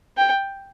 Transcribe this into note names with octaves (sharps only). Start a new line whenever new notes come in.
G5